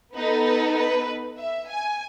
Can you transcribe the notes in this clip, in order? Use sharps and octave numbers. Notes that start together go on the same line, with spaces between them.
B3 D#4 A4 B4
B4
B4
E5
G#5